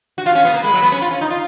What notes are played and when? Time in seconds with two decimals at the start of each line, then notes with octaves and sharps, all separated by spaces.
0.18 F#4
0.26 F4 F5
0.35 C#4
0.45 B3
0.54 A#3
0.64 G#3 B5
0.73 F#3
0.82 B3
0.92 C#4
1.02 F4
1.11 C#4
1.21 D#4
1.30 F4